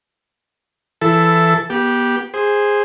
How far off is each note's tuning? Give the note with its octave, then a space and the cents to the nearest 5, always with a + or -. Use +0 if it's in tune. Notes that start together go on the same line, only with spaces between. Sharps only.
E3 +20 E4 +15 A4 +0
B3 -35 G4 +0
G#4 -10 C5 +0